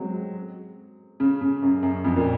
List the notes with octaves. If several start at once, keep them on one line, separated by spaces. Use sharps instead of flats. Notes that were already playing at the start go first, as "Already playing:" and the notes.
Already playing: F#3 G#3 C4
C#3
C#3
F#2
F#2
F2
A#2